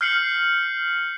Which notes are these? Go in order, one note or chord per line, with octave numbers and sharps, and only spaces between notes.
F6 G6 C7 C#7 F#7